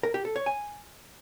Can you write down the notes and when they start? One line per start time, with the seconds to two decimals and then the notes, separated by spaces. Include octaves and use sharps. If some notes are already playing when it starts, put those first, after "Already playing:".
0.03 A#4
0.14 G4
0.25 A4
0.36 C#5
0.46 G#5